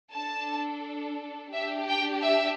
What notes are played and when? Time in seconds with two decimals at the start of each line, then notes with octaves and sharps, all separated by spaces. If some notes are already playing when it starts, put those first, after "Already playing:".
0.13 D4 A4 A5
1.53 D4 G4 E5
1.88 G5
2.22 E5